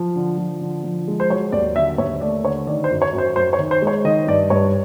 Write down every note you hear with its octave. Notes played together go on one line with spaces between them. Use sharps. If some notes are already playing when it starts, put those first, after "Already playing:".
Already playing: F3
D3
F3
D3
F3
G#3
C5
F#3 C#5
D#2 D5
D3 E5
D#2 C#5
A3 D5
D3 C#5
D#3 D5
C5
F#2
C#5
F#2
C5
F#2 C5
C#5
D#3
C5
G#3
C#5
D#3 D#5
G2 D5
G2 C#5